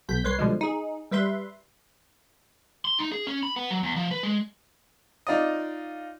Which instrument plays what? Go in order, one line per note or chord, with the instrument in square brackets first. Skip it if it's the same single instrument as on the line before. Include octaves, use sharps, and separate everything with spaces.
[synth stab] B1 B2 G6 B6
C2 B4 C#5 C6 C7
B2 D3 F3 G3 G#3
D#4 G#4
G3 B4 E5 C6
[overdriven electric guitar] C6
D#4
G#4
C#4
B5
B3
F#3
E2
F3
B4
G#3
[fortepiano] D#4 F4 D5 D#5